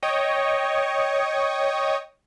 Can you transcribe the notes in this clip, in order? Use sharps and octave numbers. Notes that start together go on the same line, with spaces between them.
C#5 D#5 G5 C#6 D#6